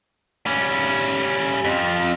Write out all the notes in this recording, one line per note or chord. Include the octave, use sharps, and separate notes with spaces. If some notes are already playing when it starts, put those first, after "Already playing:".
G3 C#4
F2 F3